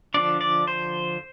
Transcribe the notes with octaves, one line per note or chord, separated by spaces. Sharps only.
D3 F3 D4 D5
D5
C5